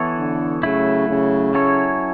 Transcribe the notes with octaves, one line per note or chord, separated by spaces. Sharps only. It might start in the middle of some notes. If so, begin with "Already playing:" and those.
Already playing: E3 B3 E4 A4 C#5
D3
C#3 F#3 A3 E4
C#3
F#3 C#4 E4 A4 C#5